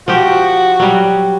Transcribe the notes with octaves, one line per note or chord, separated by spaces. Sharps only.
F3 F#4 G4
F#3 G3